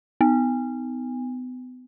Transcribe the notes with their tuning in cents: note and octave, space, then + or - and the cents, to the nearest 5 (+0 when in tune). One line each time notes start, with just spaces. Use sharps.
B3 +30